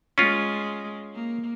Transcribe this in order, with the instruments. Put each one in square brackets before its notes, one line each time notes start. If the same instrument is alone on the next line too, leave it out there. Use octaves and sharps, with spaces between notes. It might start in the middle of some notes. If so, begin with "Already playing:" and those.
[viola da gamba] G#3 [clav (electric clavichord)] C#4 F4
[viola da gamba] A#3